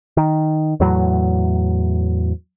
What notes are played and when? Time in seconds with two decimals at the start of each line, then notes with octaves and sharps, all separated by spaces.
0.17 D#3
0.80 E2 A2 F#3